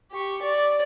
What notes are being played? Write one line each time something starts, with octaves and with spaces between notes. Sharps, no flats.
G4 C#6
D5